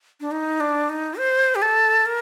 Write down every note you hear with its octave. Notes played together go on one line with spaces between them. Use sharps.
D4
D#4
D4
D#4
C5
G4
A4
A#4